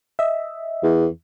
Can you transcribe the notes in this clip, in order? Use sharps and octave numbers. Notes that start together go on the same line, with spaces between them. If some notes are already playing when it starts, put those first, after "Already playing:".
D#5 E5
E2